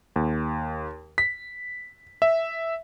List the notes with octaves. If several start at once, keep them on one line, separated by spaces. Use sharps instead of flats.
D#2
B6
E5